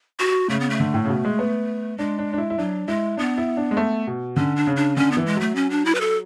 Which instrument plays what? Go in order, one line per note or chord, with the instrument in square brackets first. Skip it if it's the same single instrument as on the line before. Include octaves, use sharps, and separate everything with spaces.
[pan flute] F#4
[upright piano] C#3 [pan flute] A3
[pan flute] B3
A3
[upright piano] D3
A2
C#3
B2
G#3
B3
[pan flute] G#3 [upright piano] D4
[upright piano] D4
D4
E4
E4
[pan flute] F#3 [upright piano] D4
[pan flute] G#3 [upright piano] E4
[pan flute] B3 [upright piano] D4
[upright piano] E4
D4
G#3
A3
B2
[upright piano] D3 [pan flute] C#4
[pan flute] D4
[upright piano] C#3
[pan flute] D4
[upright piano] D3 [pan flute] C#4
[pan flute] B3
[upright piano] E3
[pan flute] G#3
[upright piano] F#3 [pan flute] A3
[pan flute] C#4
D4
E4
B4
A4